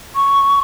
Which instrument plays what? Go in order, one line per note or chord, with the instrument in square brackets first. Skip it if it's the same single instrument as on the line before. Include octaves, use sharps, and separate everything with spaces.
[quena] C#6